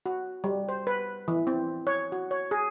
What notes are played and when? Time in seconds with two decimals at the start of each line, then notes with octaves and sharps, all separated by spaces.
0.06 F#4
0.44 G3
0.69 C5
0.87 B4
1.28 E3
1.47 C4
1.87 C#5
2.12 F#4
2.31 C#5
2.51 G#4